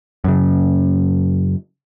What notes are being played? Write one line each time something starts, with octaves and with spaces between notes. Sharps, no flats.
F#2 C#3